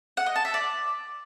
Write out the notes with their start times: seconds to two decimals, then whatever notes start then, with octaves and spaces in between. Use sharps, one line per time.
0.17 F#5
0.26 D#5
0.36 A5
0.45 E5
0.54 D5